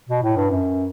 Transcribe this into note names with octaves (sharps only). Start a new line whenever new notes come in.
B2
A2
G2
F#2